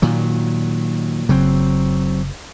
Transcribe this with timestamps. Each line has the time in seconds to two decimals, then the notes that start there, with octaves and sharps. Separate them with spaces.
0.02 A#2 D#3 F#3
1.29 F#1 C#3 F#3 C4